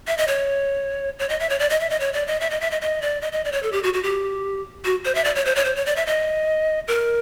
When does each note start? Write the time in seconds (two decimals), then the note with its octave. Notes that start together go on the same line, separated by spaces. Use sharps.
0.07 E5
0.18 D#5
0.28 C#5
1.19 C#5
1.29 D#5
1.40 E5
1.50 C#5
1.59 D5
1.70 D#5
1.80 E5
1.90 D#5
2.00 C#5
2.13 D5
2.27 D#5
2.41 E5
2.50 D#5
2.61 E5
2.71 D#5
2.82 D#5
3.02 D5
3.22 D#5
3.32 D#5
3.45 D5
3.52 C#5
3.63 A4
3.72 G4
3.83 F#4
3.94 F#4
4.03 G4
4.85 F#4
5.05 C5
5.15 E5
5.24 D5
5.35 C#5
5.45 C5
5.56 C#5
5.65 C5
5.76 C#5
5.86 D5
5.96 E5
6.07 D#5
6.88 A#4